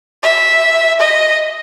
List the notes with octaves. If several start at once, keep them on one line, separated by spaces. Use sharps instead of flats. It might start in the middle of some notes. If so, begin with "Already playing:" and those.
E5
D#5